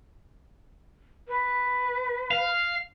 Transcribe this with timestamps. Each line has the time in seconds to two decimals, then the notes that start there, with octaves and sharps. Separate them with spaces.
1.28 B4
2.31 F5